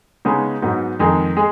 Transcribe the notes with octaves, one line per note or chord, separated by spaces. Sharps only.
C#3 G#3 B3 D#4
G#2 F#3 B3 D#4
F2 D#3 G#3 D#4 G#4
G#3 G#4